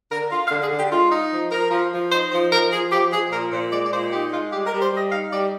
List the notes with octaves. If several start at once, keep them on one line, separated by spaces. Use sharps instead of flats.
D3 A#4
F4
F5
D3
G#4
D3
G4
G#3 F4
D#4
F3
F3 A#4
F3
F3
D#4 C5
F3 C5
F3 A#4
F3 G#4
F3 G4
F3 G#4
A#2 A#4
A#2 C5
G#3 D5
D5
A#2 C5
D#4 G4
G#3 F4
G3 G4
A#4
G3
C5
G3 D#5
D#4 F5
G3 D5